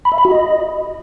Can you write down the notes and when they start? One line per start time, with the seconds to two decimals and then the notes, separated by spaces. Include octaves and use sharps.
0.05 B5
0.12 E5
0.18 B5
0.25 F#4
0.31 D#5